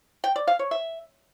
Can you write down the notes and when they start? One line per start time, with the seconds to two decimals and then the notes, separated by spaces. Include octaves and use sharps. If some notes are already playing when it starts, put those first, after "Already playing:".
0.24 G5
0.36 D5
0.47 F5
0.59 C#5
0.71 E5